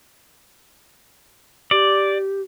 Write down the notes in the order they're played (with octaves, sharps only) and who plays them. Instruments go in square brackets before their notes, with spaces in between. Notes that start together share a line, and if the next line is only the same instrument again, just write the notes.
[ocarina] G4 [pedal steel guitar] D5